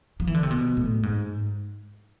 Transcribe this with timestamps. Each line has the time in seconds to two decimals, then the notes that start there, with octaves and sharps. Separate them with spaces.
0.20 F3
0.27 E3
0.34 D3
0.43 C3
0.51 B2
0.77 A2
1.03 G#2